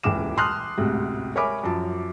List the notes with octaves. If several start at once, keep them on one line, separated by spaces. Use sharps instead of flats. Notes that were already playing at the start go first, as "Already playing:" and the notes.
D#1 C#2 E3 D6 E7
A5 C6 D#6 F6 F#6
A1 D2 G#2 C3
A#4 C#5 E5 G#5 B5 D6
F#2 F3 A5